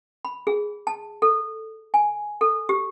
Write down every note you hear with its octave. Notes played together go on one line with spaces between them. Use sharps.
B5
G#4
A5
A4
G#5
A4
G4